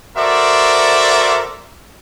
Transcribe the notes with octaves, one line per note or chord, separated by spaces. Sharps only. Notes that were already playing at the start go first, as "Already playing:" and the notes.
F#4 A4 A#4 C5 D5 E5